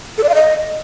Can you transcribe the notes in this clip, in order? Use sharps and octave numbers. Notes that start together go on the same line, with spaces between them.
A4
D5
F5
D#5